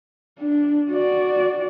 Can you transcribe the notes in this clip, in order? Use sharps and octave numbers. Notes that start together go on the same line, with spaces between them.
D4
F#4 D5